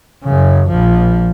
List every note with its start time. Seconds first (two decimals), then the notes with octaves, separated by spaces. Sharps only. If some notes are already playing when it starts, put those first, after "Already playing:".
0.24 F#2 C#3
0.68 A#1 F3